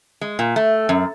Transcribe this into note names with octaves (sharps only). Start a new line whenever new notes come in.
G#3
A#2
A3
F#2